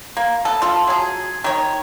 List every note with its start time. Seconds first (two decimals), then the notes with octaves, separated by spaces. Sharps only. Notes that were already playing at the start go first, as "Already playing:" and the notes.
0.17 A#3
0.45 B3 A4
0.62 F4 A4
0.87 F#3 G#4
1.44 D#3 C#5